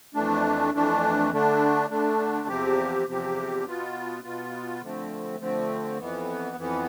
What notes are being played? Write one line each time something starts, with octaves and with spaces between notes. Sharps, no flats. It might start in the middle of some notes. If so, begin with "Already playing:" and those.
F2 E3 A3 D4
F2 E3 A3 D4
D3 A3 D4
D3 A3 D4
E2 C3 F3 C4 G4
E2 C3 F3 C4 G4
B2 B3 F4
B2 B3 F4
D3 F3 A3 C4
D3 F3 A3 C4
F2 E3 B3
F2 E3 B3